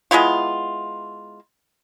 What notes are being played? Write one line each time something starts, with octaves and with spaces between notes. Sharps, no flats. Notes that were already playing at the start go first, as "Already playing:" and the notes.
G#3 B3 E4 F4